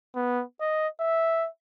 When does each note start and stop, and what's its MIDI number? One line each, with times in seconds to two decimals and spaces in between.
0.15 0.43 59
0.61 0.88 75
1.00 1.48 76